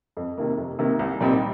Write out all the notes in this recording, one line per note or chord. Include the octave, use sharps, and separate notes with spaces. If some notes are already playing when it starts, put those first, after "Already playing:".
F2
C3 D#3 A#3
F2
C3 D#3 A#3
C2
A#2 G3 C4 D#4